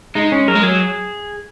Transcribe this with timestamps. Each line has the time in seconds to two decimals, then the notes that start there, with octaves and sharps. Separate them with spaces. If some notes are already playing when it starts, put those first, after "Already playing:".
0.15 G#3 D#4
0.32 C#4
0.48 F#3 A#4
0.55 G#3
0.63 F#3 G#4